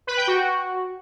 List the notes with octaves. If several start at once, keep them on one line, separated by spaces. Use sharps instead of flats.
B4
G5
F#4